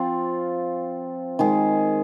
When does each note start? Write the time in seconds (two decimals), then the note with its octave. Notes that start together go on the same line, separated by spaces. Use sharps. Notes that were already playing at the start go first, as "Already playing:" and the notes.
Already playing: F3 C4 F4
1.39 D#3 G#3 D#4 G#4